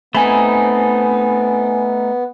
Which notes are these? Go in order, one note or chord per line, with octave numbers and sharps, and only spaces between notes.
A3 B3 C4 D#4 G#5 B5